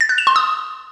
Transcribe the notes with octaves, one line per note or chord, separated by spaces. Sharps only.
A6
F#6
E7
C6
D#6